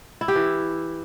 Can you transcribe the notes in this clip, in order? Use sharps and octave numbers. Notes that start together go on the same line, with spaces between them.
E4
G4
E3